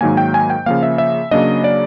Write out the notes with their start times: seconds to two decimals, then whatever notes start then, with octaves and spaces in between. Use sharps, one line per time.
0.01 G#2 D#3 F#3 A#3 G#5
0.17 G5
0.34 G#5
0.50 G5
0.66 C#3 F3 A#3 F5
0.83 E5
0.98 E5
1.31 C#3 F#3 A#3 D4 D#5
1.64 D5